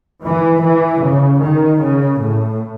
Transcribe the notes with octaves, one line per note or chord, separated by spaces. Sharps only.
E3
E3
C#3
D#3
C#3
A2